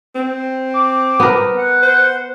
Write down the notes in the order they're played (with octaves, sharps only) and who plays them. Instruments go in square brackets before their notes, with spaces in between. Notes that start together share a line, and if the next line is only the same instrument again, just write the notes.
[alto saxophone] C4
[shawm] D6
[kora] B3 A#4
[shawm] F#5
[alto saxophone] C5